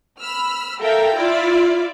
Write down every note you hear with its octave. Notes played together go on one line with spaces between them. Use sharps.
B5 E6 F6
A4 A#4 E5 F5 G5 A#5
E4 F4 D5 E5